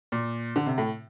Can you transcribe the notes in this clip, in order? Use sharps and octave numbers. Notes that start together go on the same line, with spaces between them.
A#2
D3
C3
A2